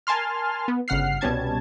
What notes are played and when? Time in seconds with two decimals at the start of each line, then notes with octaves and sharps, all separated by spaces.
0.07 A#4 G#5 A5 C6 F6
0.68 B3
0.88 G1 C#3 F#5 F6 C7
1.21 C2 B2 G3 C#4 A5 G#6